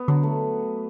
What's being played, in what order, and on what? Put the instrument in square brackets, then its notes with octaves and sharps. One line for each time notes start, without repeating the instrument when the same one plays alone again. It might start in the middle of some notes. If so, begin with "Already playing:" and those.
Already playing: [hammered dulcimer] B3
[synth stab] D3 [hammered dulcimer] F#3
[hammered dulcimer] A3